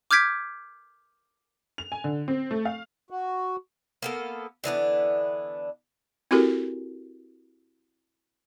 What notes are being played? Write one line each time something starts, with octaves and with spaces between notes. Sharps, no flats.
D6 F6 G6 G#6 B6 D7
F7
G#5
D3
C4
A3
F5
F#4
A#3 B3 A4
D3 E3 B3 D4
C4 E4 F#4 G4 A4 A#4